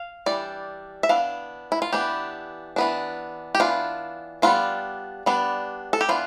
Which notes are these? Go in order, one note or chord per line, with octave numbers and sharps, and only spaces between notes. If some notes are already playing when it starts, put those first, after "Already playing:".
Already playing: F5
E3 G3 D4 D5
E5
E3 B3 D4 F5
E4
F4
E3 B3 D4 G4
E3 B3 D4
G4
E3 B3 D4 F4
G3 B3 D4 F4
G3 B3 D4
A4
G4
E3 B3 D4 F4